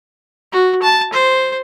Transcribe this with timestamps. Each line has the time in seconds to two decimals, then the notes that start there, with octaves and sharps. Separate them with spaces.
0.52 F#4
0.83 A5
1.13 C5